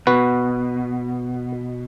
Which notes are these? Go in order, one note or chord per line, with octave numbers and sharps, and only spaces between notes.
B2 F#4 B4